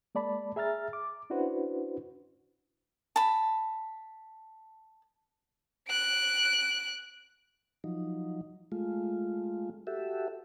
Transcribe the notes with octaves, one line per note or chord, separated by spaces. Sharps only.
G#3 A#3 D5 A5 B5
G#4 E5 A#5 F6 A6
D6
C#4 D4 E4 F#4 B4 C5
A5 B5
F#6 D7
F3 F#3 D#4
G#3 A3 F4
F#4 G4 A4 E5